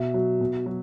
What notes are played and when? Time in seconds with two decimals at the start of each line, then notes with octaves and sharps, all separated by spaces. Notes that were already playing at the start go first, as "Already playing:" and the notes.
Already playing: B2 E5
0.14 F#3
0.40 B2
0.66 F#3